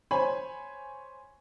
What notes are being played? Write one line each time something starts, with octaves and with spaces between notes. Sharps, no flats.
C5 C#5 G#5 B5